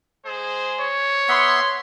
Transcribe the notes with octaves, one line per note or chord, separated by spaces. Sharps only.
G#3 G#4 C5
C#5
B3 E5 F#5 C6